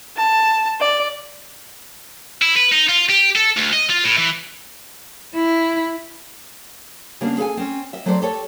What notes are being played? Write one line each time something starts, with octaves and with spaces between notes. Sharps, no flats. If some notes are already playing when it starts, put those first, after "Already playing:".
A5
D5
E4
B4
D#4
F4
G4
A4
D2
D#5
F4
A2
E3
E4
C#3 G3 A#3 B3 D4
G#4 A4 F5 G#5
C4 C#4
D#5 E5
F#3 A3 C4 A4 C5 D5
G4 A4 C#5